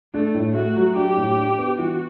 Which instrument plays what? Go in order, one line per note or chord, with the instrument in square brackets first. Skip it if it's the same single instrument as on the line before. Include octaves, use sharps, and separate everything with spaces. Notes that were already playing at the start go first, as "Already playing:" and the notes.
[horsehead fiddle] A3 [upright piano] D4
[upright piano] A2
[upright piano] A3 [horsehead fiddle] F#4
[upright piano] F#3
[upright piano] D4 [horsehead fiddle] G4
[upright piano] A2
D4
B3
[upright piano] E3 [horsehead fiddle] F#4